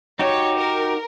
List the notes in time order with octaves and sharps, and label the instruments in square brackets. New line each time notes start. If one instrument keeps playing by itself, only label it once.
[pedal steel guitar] D#4 F#4 G4 [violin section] C#5
[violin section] A#4